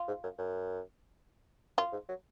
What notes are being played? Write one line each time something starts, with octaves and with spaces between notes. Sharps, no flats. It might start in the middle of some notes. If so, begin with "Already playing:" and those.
Already playing: F4
G#2
F#2
F#2
F#2 F4
G#2
F#3